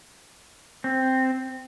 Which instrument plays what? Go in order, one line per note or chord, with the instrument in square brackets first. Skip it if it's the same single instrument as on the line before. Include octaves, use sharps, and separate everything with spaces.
[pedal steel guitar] C4